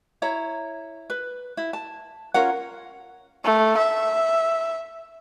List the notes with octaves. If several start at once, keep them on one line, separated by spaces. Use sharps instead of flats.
E4 C#5 A#5
B4
E4
A5
C#4 F4 A#4 F#5
A3
E5